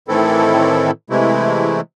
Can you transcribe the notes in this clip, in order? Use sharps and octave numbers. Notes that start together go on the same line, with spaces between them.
A2 D#3 E3 C4 E4 A4
C3 E3 G#3 A3 E4